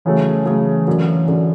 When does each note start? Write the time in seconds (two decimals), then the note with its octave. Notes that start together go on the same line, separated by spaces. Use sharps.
0.05 C#3 E3 F#3 A3
0.46 C#3 F#3 A3
0.87 F#2 D3 F#3
1.28 F#2 D3 F#3